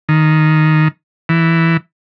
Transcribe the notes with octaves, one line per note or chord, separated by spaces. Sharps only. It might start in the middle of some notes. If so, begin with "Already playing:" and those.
D#3
E3